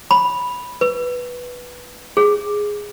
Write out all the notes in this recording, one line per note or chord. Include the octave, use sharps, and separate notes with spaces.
B5
B4
G#4